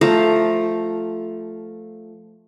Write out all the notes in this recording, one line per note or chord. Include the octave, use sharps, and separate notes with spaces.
F3 A3 A#5